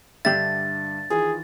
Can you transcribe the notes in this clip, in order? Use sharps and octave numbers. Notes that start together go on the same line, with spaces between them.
G2 D3 D4 G4 E5 A6
D#3 E3 F4 G#4